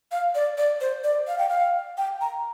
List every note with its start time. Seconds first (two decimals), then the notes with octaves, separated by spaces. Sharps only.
0.11 F5
0.35 D5
0.58 D5
0.81 C5
1.04 D5
1.27 F5
1.38 G5
1.49 F5
1.97 G5
2.21 A#5